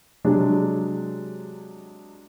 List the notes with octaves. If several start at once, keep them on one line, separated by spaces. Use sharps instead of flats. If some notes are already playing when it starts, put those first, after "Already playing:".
C3 F#3 G#3 D4